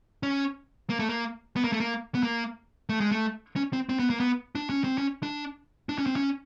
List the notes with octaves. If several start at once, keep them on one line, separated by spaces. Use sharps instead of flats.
C#4
A#3
A3
A#3
B3
A#3
A3
A#3
B3
A#3
A3
G#3
A3
C#4
C4
C4
B3
A#3
B3
D4
C#4
C4
C#4
D4
D4
C#4
C4
C#4